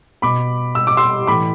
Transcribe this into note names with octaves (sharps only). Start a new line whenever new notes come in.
B2 B5 D6
E6
D6
C6 E6
A2 E3 B5 D6